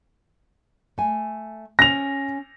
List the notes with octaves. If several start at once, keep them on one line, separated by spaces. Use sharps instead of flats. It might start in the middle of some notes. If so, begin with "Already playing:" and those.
A3 G#5
C#4 A#6 F7